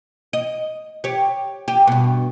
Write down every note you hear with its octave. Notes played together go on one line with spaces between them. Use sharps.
D#5
G4 C#5
G4
G2 B2